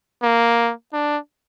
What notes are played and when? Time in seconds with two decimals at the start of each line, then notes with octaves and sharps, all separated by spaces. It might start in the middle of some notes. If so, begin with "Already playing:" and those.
0.23 A#3
0.93 D4